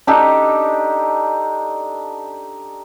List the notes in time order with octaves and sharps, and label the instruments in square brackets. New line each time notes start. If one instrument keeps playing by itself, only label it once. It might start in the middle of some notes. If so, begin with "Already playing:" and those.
[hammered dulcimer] D4 D#4 G4 A4